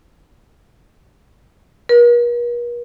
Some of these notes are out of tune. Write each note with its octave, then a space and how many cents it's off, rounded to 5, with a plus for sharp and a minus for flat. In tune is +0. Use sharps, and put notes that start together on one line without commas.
A#4 +45